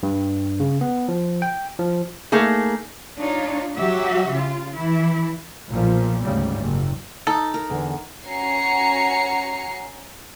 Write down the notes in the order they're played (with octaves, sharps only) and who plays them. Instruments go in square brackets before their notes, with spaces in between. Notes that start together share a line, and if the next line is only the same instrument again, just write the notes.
[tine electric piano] G2
C#3
B3
F3
G5
F3
[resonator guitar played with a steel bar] A3 A#3 D#4 G#4
[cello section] D4 D#4 F4 C#5
F#3 F#4 G4 E5
C#3 F4
E3 E4
[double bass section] B1 A#2 F3
D2 G#2 C#3 G3
F#1
[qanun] D#4 [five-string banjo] A4
[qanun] A#4
[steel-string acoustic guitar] E2 D3
[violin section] C#4 F#4 G#5 A#5 C7 C#7